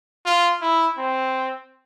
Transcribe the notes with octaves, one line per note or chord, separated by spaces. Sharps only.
F4
E4
C4